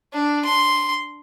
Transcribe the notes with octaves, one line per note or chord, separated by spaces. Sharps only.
D4
C6